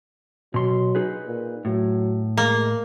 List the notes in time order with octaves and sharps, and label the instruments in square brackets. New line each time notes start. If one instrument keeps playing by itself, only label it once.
[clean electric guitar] B2 C6 [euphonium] F#3
[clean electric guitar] D#4 G#4 B4
[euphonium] A#2
[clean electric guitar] A2 [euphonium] F#3
[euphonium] G#3 [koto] A#3